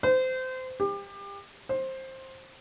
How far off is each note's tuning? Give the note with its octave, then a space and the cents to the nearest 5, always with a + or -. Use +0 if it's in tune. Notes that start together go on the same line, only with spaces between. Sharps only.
C5 -25
G4 +30
C5 +15